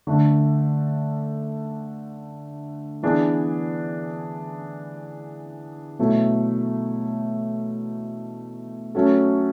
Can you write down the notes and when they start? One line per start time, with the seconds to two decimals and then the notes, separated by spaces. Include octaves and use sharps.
0.07 D3 A3 D4
3.03 E3 B3 D4 G#4
5.99 B2 F#3 A3 E4
8.95 F#3 A3 C#4 F#4 A4